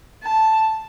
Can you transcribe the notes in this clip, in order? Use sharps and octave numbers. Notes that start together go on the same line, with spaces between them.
A5